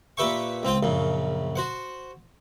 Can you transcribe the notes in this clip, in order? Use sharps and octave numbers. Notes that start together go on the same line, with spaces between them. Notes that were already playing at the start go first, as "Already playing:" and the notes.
A#2 G4 B4 E5 G5 C#6
C#2 C4 F4 G5
A#1 F#2 C#3
F#4 C5 F#5